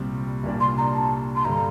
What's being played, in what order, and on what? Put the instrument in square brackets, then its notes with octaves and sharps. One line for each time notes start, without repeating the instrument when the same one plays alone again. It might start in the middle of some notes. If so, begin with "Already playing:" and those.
Already playing: [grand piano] C2 A#2 G3 C4
C2 A#2 G3 D4
[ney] C6
A#5
A5
C6
[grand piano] G2 D3 G3 [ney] A#5